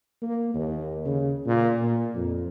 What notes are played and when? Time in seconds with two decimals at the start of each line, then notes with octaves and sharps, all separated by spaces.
0.22 A#3
0.54 D#2
1.05 C#3
1.46 A#2
1.82 A#2
2.15 F2